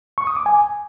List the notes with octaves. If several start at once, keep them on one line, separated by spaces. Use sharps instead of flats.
C#6
D#6
D6
G#5